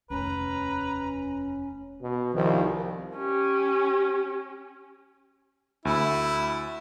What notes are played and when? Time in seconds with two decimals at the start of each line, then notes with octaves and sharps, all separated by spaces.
0.10 F1 D#2 C#4 B4 A#5
2.02 B2
2.34 C2 D#3 F3
3.16 C#4 G4
5.85 D2 E4